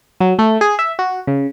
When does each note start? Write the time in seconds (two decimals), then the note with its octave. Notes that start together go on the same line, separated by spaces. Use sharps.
0.20 F#3
0.39 A3
0.61 G#4
0.79 E5
0.99 F#4
1.27 C#3